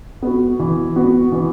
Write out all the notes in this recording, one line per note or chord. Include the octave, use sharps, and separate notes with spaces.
B3 F#4
E3
B3 F#4
E3